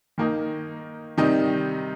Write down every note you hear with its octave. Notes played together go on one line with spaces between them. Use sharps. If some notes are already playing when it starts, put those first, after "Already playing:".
D#3 A#3 D#4
C3 D#3 G3 D#4